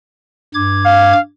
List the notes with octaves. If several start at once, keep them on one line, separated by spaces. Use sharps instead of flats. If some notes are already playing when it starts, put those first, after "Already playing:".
G2 D6 G#6
F5